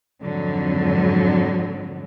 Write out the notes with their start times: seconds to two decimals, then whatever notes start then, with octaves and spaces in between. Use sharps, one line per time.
0.22 F2 G#2 D3 F#3